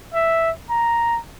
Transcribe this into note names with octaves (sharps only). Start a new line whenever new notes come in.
E5
A#5